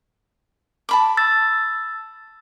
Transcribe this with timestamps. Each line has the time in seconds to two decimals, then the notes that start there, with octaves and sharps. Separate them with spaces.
0.89 A5 B5 D6
1.17 E6 A6